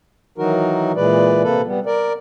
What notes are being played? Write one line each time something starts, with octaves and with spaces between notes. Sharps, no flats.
D#3 E3 F#3 D#4 F#4 A#4
A#2 E3 G#3 B4 D5
C3 A#3 A4 B4
G3 B3
A#4 D5